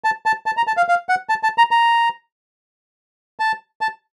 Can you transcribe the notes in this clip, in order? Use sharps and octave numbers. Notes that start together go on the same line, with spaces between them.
A5
A5
A5
A#5
A5
F5
F5
F#5
A5
A5
A#5
A#5
A5
A5